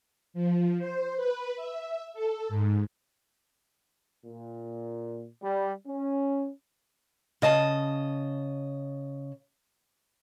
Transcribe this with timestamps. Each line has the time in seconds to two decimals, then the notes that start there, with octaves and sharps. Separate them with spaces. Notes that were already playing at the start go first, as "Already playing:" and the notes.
0.34 F3
0.78 C5
1.16 B4
1.56 E5
2.14 A4
2.49 G#2
4.26 A#2
5.44 G3
5.87 C#4
7.42 C#3 D#5 A5